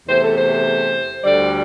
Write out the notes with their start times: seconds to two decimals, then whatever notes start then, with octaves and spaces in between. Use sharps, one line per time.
0.07 E2 C3 A3 C5
0.23 A4
0.37 C5
1.24 D2 D3 G3 D5